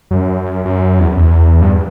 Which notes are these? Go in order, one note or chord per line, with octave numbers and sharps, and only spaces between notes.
F#2
F#2
E2
E2
G2